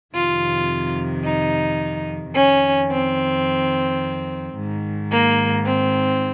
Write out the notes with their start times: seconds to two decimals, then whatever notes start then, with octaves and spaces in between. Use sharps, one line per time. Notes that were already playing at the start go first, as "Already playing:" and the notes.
0.14 F2 C3 D#3 F4
1.23 D#4
2.34 F2 D#3 C#4
2.90 C4
4.54 G#2 D#3
5.10 A#3
5.65 C4